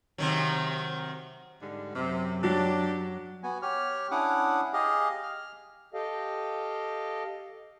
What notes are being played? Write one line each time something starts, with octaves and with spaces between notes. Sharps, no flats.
C3 D#3 F#3
G#2 D3 G3
F#2 C3
F#3 D4 G4
B3 F#4 G#5
G4 C#5 F6
C#4 D4 E4 F#5 D6 D#6
G4 G#4 D#5 F5
F6
G4 A4 D#5 F5 G5